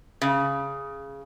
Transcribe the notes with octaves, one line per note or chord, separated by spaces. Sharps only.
C#3